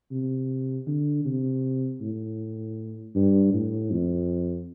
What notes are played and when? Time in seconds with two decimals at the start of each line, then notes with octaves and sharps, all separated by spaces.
0.11 C3
0.87 D3
1.25 C3
2.01 A2
3.15 G2
3.53 A2
3.91 F2